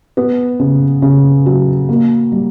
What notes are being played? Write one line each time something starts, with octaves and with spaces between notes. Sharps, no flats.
B3
C#3
C#3
F#3
A#3
G3